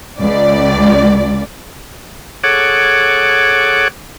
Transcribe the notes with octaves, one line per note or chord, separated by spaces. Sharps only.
C#2 D5
G#4 A4 C#5 F#5 D6